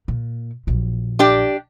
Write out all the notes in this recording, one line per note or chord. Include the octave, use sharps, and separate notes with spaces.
A#2
A#1 F#3
D4 G4 D5